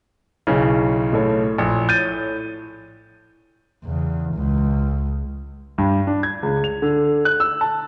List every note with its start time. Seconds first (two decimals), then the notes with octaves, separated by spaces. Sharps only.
0.47 B1 C#3 E4
1.13 A2 A4 C#5
1.58 A#1
1.89 G6 A6 D#7
3.85 E2 C#3
4.35 C#2
5.78 G2
6.07 D4
6.23 G#6
6.43 C#2
6.64 F7
6.82 D3
7.25 F#6
7.40 E6
7.61 A5